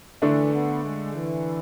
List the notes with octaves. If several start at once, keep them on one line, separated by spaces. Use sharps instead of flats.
D3 E3 A3 D4
B3
G#3
E3